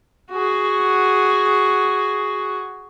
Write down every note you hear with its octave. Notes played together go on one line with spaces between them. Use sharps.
F#4 G#4